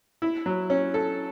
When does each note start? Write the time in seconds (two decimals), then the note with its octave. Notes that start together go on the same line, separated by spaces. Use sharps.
0.22 E4
0.46 F#3
0.70 C#4
0.94 A4